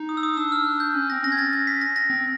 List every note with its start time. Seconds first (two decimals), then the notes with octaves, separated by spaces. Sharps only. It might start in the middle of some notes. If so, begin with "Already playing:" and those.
Already playing: D#4
0.09 D#6
0.17 E6
0.23 D#6
0.37 D4 E6
0.52 F6
0.67 F#6
0.80 G6
0.95 C#4
1.10 C4 A#6
1.24 C#4 A#6
1.32 G#6
1.38 A6
1.53 A#6
1.67 B6
1.81 A#6
1.96 A#6
2.10 C4